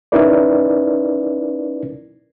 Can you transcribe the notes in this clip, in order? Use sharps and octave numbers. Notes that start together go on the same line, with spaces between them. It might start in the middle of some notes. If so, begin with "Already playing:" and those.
C#4 D#4 E4 A#4 B4 D5